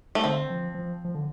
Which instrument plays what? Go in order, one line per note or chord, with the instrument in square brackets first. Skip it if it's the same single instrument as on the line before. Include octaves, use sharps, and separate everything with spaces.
[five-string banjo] A3
[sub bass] D3 [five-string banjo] C4
[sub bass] F3
F3
F3
D3